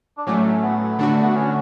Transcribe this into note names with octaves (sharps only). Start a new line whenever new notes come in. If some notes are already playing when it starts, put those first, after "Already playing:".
D4
A2 F#3 A3 C#4
C#4
B3
D3 A3 D4 F#4
B3
C#4